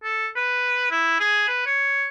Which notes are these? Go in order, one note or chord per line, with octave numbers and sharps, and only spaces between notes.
A4
B4
E4
G#4
B4
C#5